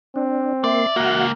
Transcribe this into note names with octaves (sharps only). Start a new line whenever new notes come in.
C4 D4
A#3 D5 E5 C6
C#2 A#3 F#4 F5 F#5